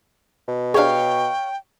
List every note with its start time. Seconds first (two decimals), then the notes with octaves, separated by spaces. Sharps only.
0.48 B2
0.74 D4 G4 G#4 C#5 F5 G5